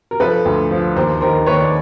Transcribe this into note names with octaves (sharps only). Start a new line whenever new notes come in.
A#4
F3 A4 B4
D2
F3
D#2 A#4 C5
D#3 A#4 C5
D#2 B4 C#5
D5